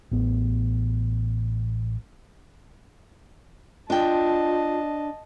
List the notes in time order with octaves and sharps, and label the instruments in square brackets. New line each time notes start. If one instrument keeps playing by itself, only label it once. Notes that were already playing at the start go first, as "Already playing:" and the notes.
[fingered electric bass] A1 B3
[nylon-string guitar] D4 G5 [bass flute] F4 [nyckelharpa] D#5 A5